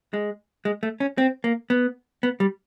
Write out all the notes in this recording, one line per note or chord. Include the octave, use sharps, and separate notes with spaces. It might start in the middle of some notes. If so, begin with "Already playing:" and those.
G#3
G#3
A3
C#4
C4
A#3
B3
B3
G3